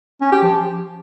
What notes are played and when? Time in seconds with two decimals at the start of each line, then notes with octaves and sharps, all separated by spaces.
0.21 C#4
0.32 G4
0.43 F3